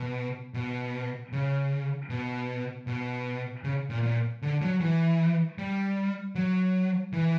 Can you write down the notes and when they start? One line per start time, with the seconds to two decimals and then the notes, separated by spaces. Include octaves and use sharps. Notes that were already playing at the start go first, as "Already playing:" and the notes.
Already playing: B2
0.54 B2
1.33 C#3
2.10 B2
2.87 B2
3.64 C#3
3.90 A#2
4.03 A#2
4.42 D3
4.62 F#3
4.81 E3
5.58 G3
6.35 F#3
7.13 E3